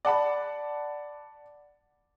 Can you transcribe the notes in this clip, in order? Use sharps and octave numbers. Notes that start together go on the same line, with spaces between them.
D5 F#5 A5 B5